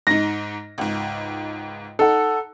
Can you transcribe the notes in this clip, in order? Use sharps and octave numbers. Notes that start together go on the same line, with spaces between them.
G#2 D#4 A#6
C#2 G#2
D#4 A4 F#5